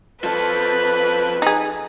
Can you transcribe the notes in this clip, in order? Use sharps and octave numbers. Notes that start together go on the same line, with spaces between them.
F3 A4 B4
D#4 G#4